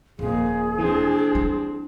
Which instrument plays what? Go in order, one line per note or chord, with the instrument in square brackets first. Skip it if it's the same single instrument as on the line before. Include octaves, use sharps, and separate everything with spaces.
[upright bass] D#1 [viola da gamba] F2 A#2 [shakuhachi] G#4
[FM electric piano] E3 [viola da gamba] C4 D4
[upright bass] G3